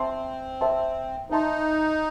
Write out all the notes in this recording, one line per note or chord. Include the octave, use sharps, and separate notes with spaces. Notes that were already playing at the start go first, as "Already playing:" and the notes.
Already playing: C4 C5 E5 A5 C6
C5 E5 A5 C6
D#4 C5 E5 A5 C6